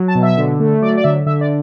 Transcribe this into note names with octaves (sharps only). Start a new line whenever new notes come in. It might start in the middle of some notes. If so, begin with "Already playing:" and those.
Already playing: F#3
A5
B2
E5
D3
A3
F#3 D5
D5
D3 E5
D3 E5
D5